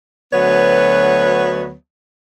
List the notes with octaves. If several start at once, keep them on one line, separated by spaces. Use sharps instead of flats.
D2 F#3 B3 B4 C#5